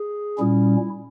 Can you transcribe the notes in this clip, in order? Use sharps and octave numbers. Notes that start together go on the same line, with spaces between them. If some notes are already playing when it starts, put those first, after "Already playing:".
Already playing: G#4
A#2 G3 C#4 E4